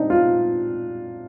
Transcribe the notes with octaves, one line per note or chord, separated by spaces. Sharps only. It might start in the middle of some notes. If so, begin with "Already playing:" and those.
Already playing: C4 D4 D#4
F4